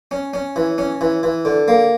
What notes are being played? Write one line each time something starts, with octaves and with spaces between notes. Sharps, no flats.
C#4
C#4
E3
C#4
E3
E3
D3
A#3